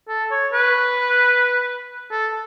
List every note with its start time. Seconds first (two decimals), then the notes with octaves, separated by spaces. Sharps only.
0.08 A4
0.31 C#5
0.53 B4
2.11 A4